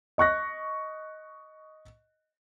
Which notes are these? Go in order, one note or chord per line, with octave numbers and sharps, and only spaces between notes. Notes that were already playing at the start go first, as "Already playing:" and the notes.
D#5 C#6 F#6 A#6